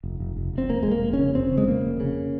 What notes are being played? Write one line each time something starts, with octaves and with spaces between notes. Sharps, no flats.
F1
F1
F1
F1 C4
F1 A#3
F1 G#3
A#3
F1
C#4
C#3
F1 C4
C#3
G#3
C#3 A#3
F1
C#3